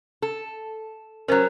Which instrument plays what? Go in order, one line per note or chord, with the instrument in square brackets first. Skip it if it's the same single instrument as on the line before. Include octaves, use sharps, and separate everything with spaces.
[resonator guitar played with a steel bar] A4
[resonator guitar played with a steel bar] F#3 C#4 [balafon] A#4 C5